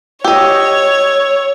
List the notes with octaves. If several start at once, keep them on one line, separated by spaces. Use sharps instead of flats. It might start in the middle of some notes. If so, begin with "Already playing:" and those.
G4 C#5 D#5 E6